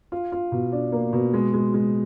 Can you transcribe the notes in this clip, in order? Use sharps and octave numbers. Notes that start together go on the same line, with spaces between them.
F4
F4
B2
D4
A#3
B2
G#3
G#3
G#3